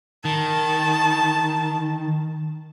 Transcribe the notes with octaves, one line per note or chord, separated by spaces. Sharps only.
D#3 A5